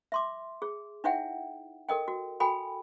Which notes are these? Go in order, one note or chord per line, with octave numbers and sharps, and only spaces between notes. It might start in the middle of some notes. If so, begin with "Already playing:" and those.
E5 C6 D6
G#4
D#4 E4 C#5 E5 F#5 G5
A4 A#4 D#5 G5
F#4
F#4 A4 G5 G#5 B5